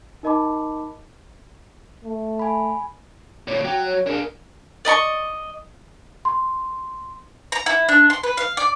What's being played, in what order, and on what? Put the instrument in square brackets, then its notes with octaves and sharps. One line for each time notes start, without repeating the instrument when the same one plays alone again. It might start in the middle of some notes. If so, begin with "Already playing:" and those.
[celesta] D#4 A#4 D#5 A5 B5 D6
[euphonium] A3
[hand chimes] G#5 B5
[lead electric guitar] D2 A#2 [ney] C#5
[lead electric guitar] F#3 [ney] G5
[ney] C#5
[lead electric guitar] D4 G#4 [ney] A#4
[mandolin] D5 D#5 A#5 C#6
[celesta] C6
[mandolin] A#5
E4
D4
C6
B4
F5
D5